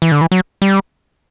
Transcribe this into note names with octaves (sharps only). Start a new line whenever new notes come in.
E3
D3
E3
F#3
G3